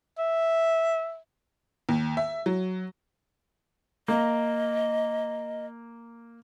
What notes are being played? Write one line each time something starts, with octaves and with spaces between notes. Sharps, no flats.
E5
D#2
E5
F#3
A#3 D#5